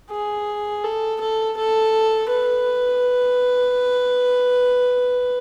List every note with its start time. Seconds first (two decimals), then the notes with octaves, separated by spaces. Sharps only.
0.11 G#4
0.84 A4
1.20 A4
1.57 A4
2.30 B4